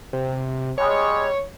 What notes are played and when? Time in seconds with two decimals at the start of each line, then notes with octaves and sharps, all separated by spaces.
0.13 C3
0.78 G3 G#3 C#5